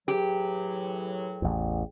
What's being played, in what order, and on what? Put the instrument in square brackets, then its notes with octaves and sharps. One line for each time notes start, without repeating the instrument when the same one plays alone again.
[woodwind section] A2 E3 F#3 [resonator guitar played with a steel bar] G4 [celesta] G#4 G5
[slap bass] A1 E2